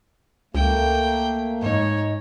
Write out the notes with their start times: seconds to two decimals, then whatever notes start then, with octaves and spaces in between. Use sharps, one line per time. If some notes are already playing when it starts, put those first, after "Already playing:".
0.54 C#2 A3 A#3 G5
1.62 G#2 D#4 C#5